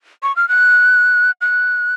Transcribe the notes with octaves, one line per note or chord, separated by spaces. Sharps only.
C#6
F6
F#6
F#6